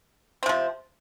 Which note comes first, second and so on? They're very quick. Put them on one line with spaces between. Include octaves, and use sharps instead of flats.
C4 C3 F3